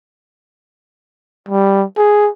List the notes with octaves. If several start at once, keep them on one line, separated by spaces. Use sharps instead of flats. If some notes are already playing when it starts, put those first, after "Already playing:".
G3
G#4